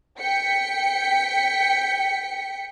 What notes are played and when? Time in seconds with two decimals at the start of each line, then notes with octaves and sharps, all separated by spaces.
0.19 G5 B6 C#7